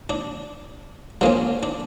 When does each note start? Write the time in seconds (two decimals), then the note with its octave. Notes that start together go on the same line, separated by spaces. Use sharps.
0.10 D4
1.21 G2 F3 A#3 C#4 D4
1.63 D4